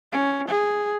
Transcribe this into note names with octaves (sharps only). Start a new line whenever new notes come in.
C#4
G#4